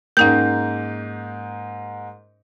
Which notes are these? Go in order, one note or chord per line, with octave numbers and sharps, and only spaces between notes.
G#2 A#3 C#4 D#4 G5 G6